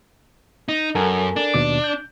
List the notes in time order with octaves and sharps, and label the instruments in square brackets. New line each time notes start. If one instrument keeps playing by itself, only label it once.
[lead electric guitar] D#4
[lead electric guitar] F#2 [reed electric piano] A4 A#4 G#5
[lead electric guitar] D4
[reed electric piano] D#2 B2 D6
G6